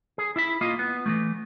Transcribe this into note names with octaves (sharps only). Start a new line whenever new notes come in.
G#4
E4 E5 B5
A#3 F4 D#5
B3
E3 F#3 A3